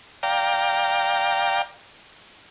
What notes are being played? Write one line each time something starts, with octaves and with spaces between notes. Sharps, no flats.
D5 F5 G5 A#5